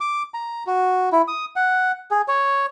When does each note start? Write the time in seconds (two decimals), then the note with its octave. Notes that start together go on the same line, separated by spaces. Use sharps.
0.01 D6
0.34 A#5
0.67 F#4
1.12 E4
1.28 D#6
1.56 F#5
2.11 G#4
2.28 C#5